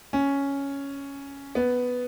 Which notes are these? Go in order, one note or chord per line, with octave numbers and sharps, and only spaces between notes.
C#4
B3